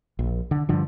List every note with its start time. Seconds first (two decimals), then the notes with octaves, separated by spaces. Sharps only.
0.19 A#1
0.51 D3
0.69 G2 D3 F3